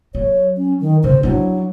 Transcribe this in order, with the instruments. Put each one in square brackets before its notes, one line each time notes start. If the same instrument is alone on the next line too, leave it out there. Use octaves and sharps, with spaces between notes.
[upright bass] F#3 [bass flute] C#5
[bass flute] C#4
D#3
[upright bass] C#3 [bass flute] C5
[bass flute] F#3 [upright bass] D4 E4